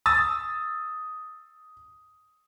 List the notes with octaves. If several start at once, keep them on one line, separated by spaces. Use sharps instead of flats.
D#6 E6 A6